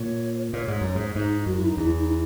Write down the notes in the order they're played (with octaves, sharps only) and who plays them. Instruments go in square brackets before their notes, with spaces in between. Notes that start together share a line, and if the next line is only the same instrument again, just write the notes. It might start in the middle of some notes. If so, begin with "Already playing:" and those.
Already playing: [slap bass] A#2 [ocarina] C#5
[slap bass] A#2 [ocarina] C#5
[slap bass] G#2
F#2
G#2
[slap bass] G#2 [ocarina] D#4
[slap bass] F#2 [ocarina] F#4
[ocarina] E4
D#4
[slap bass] E2 [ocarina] E4
[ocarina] D#4
E4